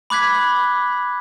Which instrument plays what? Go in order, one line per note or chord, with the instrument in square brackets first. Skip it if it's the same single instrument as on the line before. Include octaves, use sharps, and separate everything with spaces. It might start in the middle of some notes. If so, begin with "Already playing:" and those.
[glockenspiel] B5 D6 F#6 G#6 B6